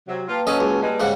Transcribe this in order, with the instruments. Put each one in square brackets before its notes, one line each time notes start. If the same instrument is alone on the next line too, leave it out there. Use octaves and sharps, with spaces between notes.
[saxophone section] C3 F#3
[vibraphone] A#3 B4 A5 [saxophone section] F4 G4
[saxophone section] F#3 C#4 [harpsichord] A4 D#5
[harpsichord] C#2
[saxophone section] G3 G#3
[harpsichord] G#2 C#3 G3 [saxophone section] F#5